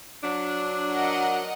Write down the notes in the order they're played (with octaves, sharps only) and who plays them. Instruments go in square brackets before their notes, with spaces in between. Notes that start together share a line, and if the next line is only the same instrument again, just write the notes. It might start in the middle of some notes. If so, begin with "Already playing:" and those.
[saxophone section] F#3 D4
[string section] A#4 D#5 F#5